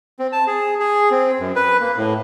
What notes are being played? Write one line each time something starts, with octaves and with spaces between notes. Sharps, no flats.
C4
A5
G#4
G#4
C4
F#2
B4
A#3
A2